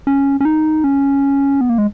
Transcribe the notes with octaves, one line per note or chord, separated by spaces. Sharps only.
C#4
C#4
D#4
C#4
B3
A#3
G#3